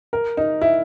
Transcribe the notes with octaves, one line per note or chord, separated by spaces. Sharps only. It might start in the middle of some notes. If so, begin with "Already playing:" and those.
A#4
D#4
E4